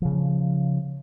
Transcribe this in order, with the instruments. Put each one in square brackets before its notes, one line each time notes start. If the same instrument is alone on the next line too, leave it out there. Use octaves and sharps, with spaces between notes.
[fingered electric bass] C#3 F3